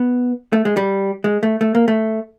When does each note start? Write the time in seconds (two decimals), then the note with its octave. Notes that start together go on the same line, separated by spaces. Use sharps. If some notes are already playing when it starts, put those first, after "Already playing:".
Already playing: B3
0.53 A3
0.65 G#3
0.77 G3
1.24 G#3
1.43 A3
1.61 A3
1.75 A#3
1.88 A3